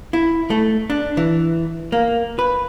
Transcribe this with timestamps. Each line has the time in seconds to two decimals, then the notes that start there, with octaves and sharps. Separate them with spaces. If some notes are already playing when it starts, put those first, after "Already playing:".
0.13 E4
0.50 A3
0.90 D4
1.17 E3
1.92 A#3
2.39 B4